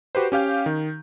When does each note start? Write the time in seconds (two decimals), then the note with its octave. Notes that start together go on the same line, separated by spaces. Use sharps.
0.15 F#4 G4 B4 C5
0.32 C#4 G4 F5 G6
0.66 D#3